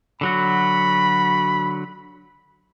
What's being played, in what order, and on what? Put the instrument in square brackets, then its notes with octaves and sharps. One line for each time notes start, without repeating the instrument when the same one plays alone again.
[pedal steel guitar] D3 F#3 F#4 [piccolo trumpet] B5